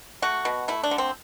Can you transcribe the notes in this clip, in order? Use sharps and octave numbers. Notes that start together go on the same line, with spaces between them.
A3 F#4
B2
A3 E4
D4
D3
C4